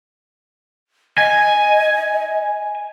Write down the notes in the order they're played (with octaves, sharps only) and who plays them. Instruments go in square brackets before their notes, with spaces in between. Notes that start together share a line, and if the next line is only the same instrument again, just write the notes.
[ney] D#5 [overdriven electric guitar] G#5